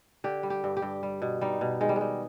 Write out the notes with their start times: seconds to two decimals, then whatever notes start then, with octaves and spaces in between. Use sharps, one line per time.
0.24 D3 G4
0.43 G3
0.50 G4
0.64 G2
0.77 G4
0.82 G2
1.03 G3
1.22 B2
1.41 G3 D#4
1.61 B2
1.81 D#3 G#3
1.89 G3
1.96 G#3
2.01 G3